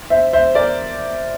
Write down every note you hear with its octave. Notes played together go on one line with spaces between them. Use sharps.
C5 E5
C5 E5
A#4 D5